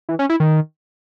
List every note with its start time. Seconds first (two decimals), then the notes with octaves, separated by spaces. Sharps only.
0.09 E3
0.19 C#4
0.29 E4
0.40 D#3